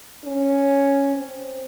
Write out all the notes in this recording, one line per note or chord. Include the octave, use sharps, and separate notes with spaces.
C#4
C4